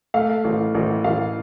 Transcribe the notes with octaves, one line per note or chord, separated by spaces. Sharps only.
A3 F5
A1
A1
A1 F5